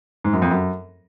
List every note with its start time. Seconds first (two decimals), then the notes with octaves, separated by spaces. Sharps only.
0.24 G#2
0.33 F#2
0.42 F2
0.51 F#2